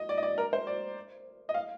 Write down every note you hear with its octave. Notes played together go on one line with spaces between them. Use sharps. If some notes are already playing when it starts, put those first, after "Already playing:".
Already playing: D#5
D5
D#5
D5
A#4
C5
D5
D#5
F5